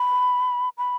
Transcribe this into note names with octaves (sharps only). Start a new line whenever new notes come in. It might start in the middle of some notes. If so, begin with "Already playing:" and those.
Already playing: B5
B5